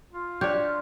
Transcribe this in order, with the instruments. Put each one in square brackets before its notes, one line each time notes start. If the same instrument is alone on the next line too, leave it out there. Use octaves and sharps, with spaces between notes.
[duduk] F4
[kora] D4 G4 C#5 [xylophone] D5 G6